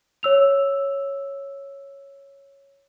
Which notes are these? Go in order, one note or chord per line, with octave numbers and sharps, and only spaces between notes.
C#5 E6 F7